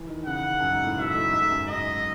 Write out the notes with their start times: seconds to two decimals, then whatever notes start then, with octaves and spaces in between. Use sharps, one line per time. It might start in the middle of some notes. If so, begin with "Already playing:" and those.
Already playing: E3
0.08 D#3
0.25 C#3 F#5
0.60 F#2
0.72 G#2
0.84 A2
0.98 B2 E5
1.15 A2
1.33 G#2
1.51 F#2
1.68 G#2 D#5